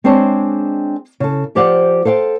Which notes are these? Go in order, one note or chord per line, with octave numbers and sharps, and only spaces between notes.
G#3 C4 D4 G#4 C#5 A5
C#3 A4
F3 G4 C5 D5 F5 F#5
A4 C5 F5 G5